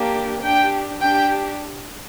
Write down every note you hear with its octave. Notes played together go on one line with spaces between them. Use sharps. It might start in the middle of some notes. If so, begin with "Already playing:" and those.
Already playing: A#3 D4 G4
D4 G4 G5
D4 G4 G5